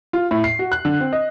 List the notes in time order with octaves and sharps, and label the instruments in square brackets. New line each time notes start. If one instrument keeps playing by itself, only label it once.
[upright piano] F4
A2
C7
F#4
F#6
D3
C4
D#5